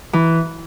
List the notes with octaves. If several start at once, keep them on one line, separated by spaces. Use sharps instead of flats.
E3